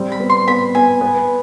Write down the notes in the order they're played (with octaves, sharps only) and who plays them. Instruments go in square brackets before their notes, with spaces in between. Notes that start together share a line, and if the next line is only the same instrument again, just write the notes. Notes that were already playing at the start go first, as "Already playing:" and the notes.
Already playing: [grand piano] G3 C4
[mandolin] B5
[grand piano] B3
[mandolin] C6
[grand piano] B3 [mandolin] B5
[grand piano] B3 [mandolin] G#5
[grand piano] B3